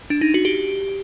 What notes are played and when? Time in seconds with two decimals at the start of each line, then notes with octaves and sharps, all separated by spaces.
0.10 D4
0.21 D#4
0.34 F#4
0.45 G4